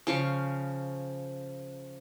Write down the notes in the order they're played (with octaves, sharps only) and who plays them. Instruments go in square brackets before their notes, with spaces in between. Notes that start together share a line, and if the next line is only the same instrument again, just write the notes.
[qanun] C#3 F3 F5 C#6